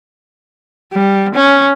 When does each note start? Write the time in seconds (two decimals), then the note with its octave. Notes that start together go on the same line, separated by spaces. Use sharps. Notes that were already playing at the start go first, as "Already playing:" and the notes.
0.93 G3
1.36 C#4